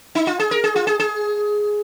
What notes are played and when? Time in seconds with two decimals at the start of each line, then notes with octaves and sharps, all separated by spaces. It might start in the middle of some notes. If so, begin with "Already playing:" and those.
0.15 D#4
0.27 F4
0.39 G#4
0.51 A#4
0.64 G#4
0.76 F4
0.87 G#4
0.99 G#4